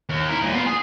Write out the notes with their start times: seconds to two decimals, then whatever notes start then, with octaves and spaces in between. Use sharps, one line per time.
0.10 D#2
0.29 E4 A#4
0.42 D#2 A#2
0.54 B3 F4
0.67 G#4